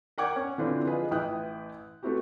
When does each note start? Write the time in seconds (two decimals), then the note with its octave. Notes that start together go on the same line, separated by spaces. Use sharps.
0.18 A#4 D5 F#5 G5 D6 G#6
0.36 C#4
0.58 D3 E3 C4 D4 F4 B4
0.86 F3 F4 G#4 B4 D#5
1.11 A1 E4 B4 G5 D#6 F#6
2.03 A3 B3 C4 E4 F#4 G4